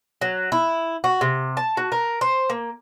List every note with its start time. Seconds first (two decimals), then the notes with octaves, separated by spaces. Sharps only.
0.21 F#3
0.52 E4
1.04 F#4
1.21 C3
1.57 A5
1.77 F#4
1.92 A#4
2.21 C5
2.50 A#3